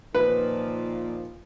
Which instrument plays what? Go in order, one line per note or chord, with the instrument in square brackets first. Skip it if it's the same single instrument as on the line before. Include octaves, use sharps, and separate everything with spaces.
[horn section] A#2 D#3 F3 [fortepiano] B4